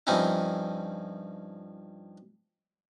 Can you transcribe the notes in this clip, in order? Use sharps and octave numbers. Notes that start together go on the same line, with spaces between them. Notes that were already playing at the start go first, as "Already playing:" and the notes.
G2 F3 C4 C#4 D#4 E4